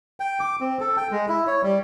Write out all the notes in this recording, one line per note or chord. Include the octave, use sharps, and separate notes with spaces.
G5
D6
C4
A4
G5
G#3
E4
C#5
G3